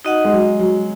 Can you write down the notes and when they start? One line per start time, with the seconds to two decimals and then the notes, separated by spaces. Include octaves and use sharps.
0.05 D#4 F#4 D#5 F#5
0.25 G#3
0.32 F#3
0.59 F#3